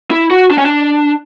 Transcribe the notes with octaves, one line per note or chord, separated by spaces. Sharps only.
E4
F#4
D4
C#4
D4